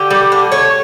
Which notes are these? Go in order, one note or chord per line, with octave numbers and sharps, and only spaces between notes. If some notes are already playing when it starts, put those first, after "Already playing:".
Already playing: D3 G4
G3
D3
A3 C#5